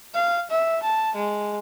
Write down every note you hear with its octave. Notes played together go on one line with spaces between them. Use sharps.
F5
E5
A5
G#3